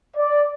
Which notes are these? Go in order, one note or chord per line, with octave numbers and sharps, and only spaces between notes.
D5